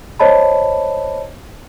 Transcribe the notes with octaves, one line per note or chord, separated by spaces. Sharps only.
C5 C#5 D#5 A5 B5